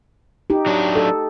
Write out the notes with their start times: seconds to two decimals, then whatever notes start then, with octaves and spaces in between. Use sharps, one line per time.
0.50 D#4 G4
0.66 F#3 D4
0.95 A4